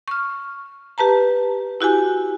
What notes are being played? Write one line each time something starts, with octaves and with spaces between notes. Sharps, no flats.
C#6 F6
G4 B4 A5 A#5
E4 F#4 G4 G#5